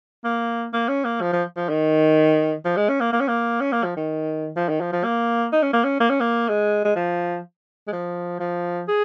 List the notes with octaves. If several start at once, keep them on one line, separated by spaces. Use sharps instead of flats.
A#3
A#3
C#4
A#3
F3
F3
F3
D#3
F3
G#3
C#4
A#3
A#3
C#4
A#3
C#4
A#3
F3
D#3
F3
D#3
F3
F3
A#3
D#4
C#4
A#3
C#4
A#3
C#4
A#3
G#3
G#3
F3
G#3
F3
F3
G#4